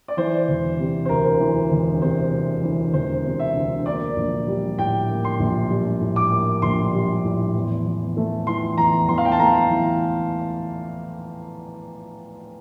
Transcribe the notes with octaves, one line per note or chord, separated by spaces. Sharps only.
D5
E3 C5
E1
C3
C5
D2 A#4
E3
E1
C3 C5
D2
E3
E1 C5
C3
E5
D2
A#3 D5
A#1
G3
A2 G5
A#3
C6
A#1
G3
A2
D6
A#3
A#1 C6
G3
A2
E2
E2
A3
E3 C6
E2 A#5
E2 C6
F5
G5
A5
A3 A#5
E3